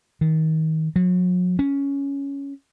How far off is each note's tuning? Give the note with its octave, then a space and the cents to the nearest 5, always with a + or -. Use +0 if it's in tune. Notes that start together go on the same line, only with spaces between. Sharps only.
D#3 +30
F#3 -40
C#4 +10